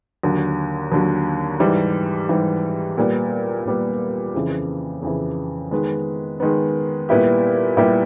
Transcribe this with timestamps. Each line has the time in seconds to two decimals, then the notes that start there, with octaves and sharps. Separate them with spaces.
0.23 D#2 D3 F#3
0.92 D#2 D3 F#3
1.60 G#2 E3 G3
2.29 G#2 E3 G3
2.98 A#2 G3 B3
3.65 A#2 G3 B3
4.34 F2 C#3 E3
5.02 F2 C#3 E3
5.71 D#3 G#3 B3
6.40 D#3 G#3 B3
7.09 A#2 G3 B3 E4 G4
7.77 A#2 G3 B3 E4 G4